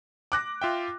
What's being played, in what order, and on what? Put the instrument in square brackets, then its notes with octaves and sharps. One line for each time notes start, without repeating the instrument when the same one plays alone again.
[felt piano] D6 F#6 A#6
[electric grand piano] F4 E5 G5